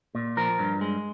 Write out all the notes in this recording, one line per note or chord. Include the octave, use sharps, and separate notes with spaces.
A#2
F3 A#4
G2
G#3